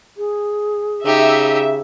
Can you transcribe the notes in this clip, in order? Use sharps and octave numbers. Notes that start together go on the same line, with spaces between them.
G#4
C#3 D#4 G4 E5